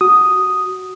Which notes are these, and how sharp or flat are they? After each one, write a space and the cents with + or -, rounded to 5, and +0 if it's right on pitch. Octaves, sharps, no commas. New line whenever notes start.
F#4 +10 D#6 +0